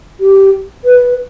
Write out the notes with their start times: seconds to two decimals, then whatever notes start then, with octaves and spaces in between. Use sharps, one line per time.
0.20 G4
0.84 B4